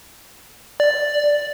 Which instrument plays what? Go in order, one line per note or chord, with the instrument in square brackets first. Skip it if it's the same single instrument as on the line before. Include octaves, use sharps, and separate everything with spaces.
[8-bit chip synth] D5